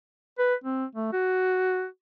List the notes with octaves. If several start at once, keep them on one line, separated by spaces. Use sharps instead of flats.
B4
C4
A3
F#4